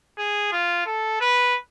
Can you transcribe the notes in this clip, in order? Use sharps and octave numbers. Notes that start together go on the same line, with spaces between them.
G#4
F4
A4
B4